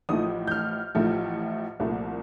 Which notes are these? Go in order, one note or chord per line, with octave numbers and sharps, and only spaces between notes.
A1 A2 F3 A3 D#6
G6
F6
A1 A2 F3 A3
C2 A#2 F3 A3